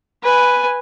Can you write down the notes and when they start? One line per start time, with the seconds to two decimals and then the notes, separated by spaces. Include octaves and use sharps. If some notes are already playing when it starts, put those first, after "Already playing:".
0.23 B4 G#5